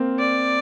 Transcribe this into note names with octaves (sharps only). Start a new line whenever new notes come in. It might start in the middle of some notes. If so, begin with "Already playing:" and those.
Already playing: A#3 C4
D5